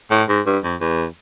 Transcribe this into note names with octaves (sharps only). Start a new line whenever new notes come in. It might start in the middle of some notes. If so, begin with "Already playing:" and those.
A2
G#2
G2
F2
E2